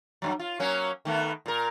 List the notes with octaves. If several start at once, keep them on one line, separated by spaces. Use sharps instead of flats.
G2 B2 F#3
F4
F#3 A#3 C#4
D#3 A3 B3
A#2 A#4